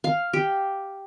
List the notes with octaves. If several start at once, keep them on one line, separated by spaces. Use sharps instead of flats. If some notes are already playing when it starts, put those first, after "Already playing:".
F5
G4